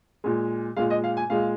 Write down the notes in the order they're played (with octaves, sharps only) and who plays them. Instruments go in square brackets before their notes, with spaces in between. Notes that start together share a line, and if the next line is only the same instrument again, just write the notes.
[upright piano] A#2 G#3
A#2 G#3 F5
D#5
F5
G#5
A#2 G#3 F5